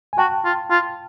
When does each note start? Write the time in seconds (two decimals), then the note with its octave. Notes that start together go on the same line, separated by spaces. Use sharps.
0.13 G#5
0.18 F#4 G5 A5
0.45 F4
0.71 F4